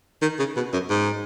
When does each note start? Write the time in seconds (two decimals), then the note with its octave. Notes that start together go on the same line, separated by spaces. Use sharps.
0.22 D#3
0.39 C#3
0.56 B2
0.73 F#2
0.90 G#2